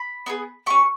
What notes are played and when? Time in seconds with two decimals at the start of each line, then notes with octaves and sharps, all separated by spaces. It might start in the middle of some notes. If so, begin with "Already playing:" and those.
Already playing: B5
0.26 B3 D#4 G#4
0.66 C#4 G4 C#6